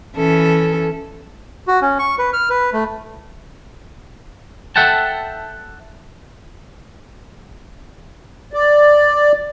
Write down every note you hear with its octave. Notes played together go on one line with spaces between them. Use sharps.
E3 C#4 A4
F#4
C#4
C#6
B4
F6
B4
A3
A4 E5 F#5 G5 A5
D5